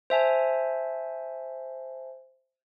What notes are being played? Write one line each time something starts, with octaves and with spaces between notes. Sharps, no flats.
C5 E5 G#5 A5